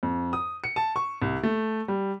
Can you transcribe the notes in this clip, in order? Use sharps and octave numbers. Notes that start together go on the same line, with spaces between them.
F2
D#6
C#7
A5
C#6
C2
A3
G3